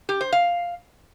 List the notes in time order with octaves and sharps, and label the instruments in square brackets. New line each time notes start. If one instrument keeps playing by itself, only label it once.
[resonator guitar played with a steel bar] G4
C5
F5